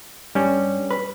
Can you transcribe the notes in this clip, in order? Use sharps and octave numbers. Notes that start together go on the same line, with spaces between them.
G2 G3 C#4
B4